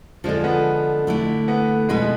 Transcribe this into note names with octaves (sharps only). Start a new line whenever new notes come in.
D3 F3 G#3 D4 A4
B3
D3 A3 E4
B3
B2 G#3 B3 E4 B4